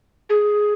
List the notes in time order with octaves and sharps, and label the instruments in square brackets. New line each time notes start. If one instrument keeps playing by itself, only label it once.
[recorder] G#4